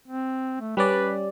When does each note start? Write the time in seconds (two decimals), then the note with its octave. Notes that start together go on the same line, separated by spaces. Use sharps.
0.08 C4
0.61 A3
0.77 G3 C#4 B4 D5